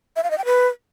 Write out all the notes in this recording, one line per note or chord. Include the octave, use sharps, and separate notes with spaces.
E5
F5
D#5
G5
B4